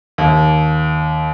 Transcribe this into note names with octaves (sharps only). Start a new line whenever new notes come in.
D#2